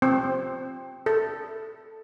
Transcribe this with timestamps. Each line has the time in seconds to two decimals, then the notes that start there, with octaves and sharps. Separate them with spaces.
0.02 C4
1.06 A4